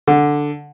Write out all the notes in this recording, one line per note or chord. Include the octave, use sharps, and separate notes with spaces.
D3